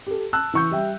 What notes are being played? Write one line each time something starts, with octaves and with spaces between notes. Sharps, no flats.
G4 A4
A5 E6 F#6
E3 C#6 G6
G3 E5 G5